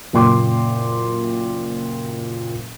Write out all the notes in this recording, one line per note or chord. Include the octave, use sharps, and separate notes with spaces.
F#1 A#2 G5 C6 D6